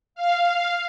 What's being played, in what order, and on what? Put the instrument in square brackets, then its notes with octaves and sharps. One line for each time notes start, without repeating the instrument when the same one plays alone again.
[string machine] F5